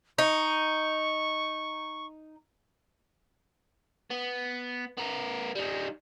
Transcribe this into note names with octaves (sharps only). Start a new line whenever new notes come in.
D#4 C#6
B3
B3 A#4
G3 D#4